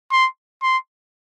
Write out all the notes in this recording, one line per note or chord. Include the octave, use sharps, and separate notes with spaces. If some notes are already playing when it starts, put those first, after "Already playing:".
C6
C6